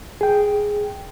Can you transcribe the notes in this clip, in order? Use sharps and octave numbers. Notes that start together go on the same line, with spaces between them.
G#4 G5